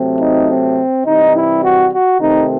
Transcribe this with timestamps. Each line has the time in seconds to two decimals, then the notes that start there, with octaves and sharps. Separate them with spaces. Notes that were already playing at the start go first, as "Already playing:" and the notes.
Already playing: C3 F#3 A3 C4
0.20 D#4
0.49 C4
1.05 C3 E3 G3 D#4
1.35 E4
1.62 F#4
1.91 F#4
2.20 C3 D#3 A3 C4 D#4